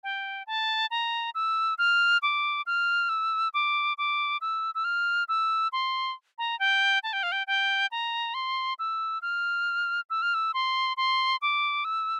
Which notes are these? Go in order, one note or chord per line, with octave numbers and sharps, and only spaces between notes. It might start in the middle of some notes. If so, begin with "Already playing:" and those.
G5
A5
A#5
E6
F6
D6
F6
E6
D6
D6
E6
E6
F6
E6
C6
A#5
G5
A5
G5
F5
G5
G5
A#5
C6
E6
F6
E6
F6
E6
C6
C6
D6
E6